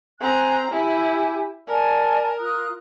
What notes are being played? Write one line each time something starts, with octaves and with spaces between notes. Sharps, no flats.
C4 G#5 A#5 F#6
E4 G4 G#5
A#4 D5 G#5 A5
F4 D#6 F#6